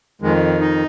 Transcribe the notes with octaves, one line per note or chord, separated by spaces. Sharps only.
F2 D#3 G#3
D#4